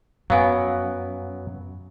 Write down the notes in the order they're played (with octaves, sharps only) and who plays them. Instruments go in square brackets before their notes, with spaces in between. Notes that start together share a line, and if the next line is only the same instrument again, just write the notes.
[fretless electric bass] F#2 [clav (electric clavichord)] F#3 B3 [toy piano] F5 G#5